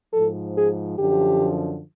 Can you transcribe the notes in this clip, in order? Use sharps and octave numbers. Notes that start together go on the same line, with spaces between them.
G#2 F3 A4
G#4
F#2 D3 F3 G4